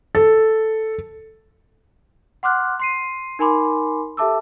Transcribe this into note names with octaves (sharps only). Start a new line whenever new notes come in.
A4
F#5 C6 D6 F6 F#6
C6 C7 D#7
D#4 A#4 G#5 B5 C6 D6
G4 A4 E5 A5 D6 E6